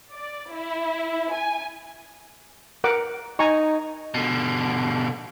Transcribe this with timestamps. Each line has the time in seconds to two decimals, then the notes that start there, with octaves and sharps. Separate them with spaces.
0.13 D5
0.54 E4
1.35 G#5
2.84 A#4 F#5 D6
3.39 D#4 G#5 A#5 C#6
4.14 B2 D3